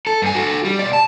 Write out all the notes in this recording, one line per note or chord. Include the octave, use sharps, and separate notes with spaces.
A4
G2 G#5
F#4 A4
G3
B2 D5
A5